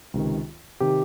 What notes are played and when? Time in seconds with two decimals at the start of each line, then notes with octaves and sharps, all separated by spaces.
0.14 C#2 C3 D#3
0.80 C3 D#3 G4